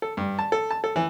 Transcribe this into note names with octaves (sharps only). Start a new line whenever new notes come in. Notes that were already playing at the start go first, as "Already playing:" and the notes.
A4
G2
A5
A4
A5
A4
E3